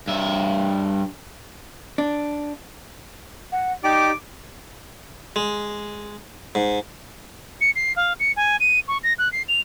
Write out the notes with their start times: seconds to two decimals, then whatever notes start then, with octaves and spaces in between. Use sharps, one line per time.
0.08 G2 E5
1.98 D4
3.52 F#5
3.84 D#4 G4 D5 G5 D6
5.36 G#3
6.55 G#2
7.61 C#7
7.76 C7
7.96 F5
8.20 C#7
8.36 G#5
8.60 D#7
8.88 C#6
9.03 A#6
9.18 F#6
9.32 C7
9.48 F7